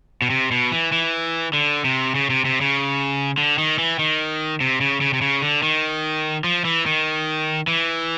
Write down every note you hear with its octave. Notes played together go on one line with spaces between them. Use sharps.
B2
C3
B2
E3
E3
D3
C3
C#3
C3
C3
C#3
D3
D#3
E3
D#3
C3
C#3
C#3
C3
C#3
D3
D#3
F3
E3
D#3
E3